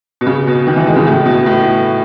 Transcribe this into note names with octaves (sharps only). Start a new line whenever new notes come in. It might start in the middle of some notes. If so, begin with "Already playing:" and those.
B2
C#3
B2
D#3
E3
G#3
C#3
A2
B2
A2